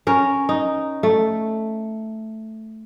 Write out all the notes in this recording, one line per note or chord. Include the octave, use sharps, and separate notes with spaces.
C#4 A#4
D#4
A3